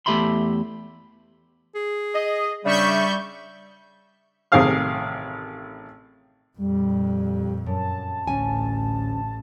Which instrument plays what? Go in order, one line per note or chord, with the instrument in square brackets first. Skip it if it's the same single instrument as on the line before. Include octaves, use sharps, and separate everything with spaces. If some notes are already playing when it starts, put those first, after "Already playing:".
[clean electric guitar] E2 A3 G4 E5 B5 C6
[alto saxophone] G#4
[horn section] D#5
[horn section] C#3 [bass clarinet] G3 [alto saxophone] D4 [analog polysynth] E5 C#6 G6
[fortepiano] A1 C3 D#3 G#4 F5 F6
[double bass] F2 A#2 [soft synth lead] G3
[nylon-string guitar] F#2 [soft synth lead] A5
[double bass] A1 A2 [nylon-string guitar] D2 C#4 G#5